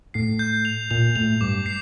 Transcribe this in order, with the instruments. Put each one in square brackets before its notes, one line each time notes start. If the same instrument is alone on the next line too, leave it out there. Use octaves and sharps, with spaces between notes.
[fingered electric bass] A2 [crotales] C7
[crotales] G6
F7
[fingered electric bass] A#2 [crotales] F7
[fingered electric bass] A2 [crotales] F7
[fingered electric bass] G2 [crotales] D6
[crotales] C7